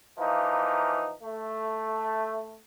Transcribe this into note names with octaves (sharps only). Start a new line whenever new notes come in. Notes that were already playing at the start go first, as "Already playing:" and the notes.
E3 F3 A#3 D#4
A3